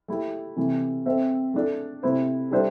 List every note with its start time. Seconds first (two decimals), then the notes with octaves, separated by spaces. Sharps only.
0.08 A3 E4 G4
0.56 C3 E3 A3
1.05 C4 A4 C5 E5
1.54 A3 D4 A4
2.03 C3 A3 E4 C5
2.51 G3 D4 A4 C5 E5